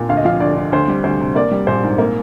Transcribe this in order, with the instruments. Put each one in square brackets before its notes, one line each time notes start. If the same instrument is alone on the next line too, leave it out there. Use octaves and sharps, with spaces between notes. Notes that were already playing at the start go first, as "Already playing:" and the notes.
Already playing: [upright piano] A#2
D2 F5
D#5
F3 F5
D2 D5
D3
D2 C5
G3
D2 C5
C3
A#3 D5
G3
A#1 C5
G#2
A#3